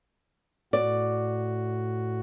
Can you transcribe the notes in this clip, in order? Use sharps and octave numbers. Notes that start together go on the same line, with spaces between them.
A2 F#4 D5